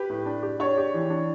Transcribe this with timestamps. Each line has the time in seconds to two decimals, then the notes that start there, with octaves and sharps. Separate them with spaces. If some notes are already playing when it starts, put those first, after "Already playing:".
Already playing: G4 B4
0.10 A2
0.26 D4
0.43 G4
0.60 D4 C#5
0.78 G4
0.94 E3
1.10 D4